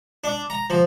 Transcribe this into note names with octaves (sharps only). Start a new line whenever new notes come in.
D4
A#5
F3